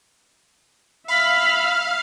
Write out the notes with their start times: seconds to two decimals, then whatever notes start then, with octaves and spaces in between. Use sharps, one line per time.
1.08 E5 F5 B5 F6